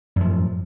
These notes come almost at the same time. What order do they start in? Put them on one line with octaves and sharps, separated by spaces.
F#2 F3 A2